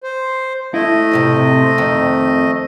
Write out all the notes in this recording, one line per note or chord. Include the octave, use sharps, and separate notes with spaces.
C5
A3 E4 D#5
F2 A2 C3
F2 D#3